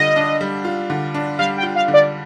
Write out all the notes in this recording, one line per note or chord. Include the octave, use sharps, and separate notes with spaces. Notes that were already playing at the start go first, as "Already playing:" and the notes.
Already playing: D3 G3 F4 D#5
D4
G3
F4
D3
D4
G3 F5
G5
F4
F5
D3
D5